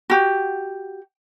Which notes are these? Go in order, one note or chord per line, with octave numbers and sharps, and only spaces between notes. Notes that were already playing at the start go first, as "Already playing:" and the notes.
F#4 G4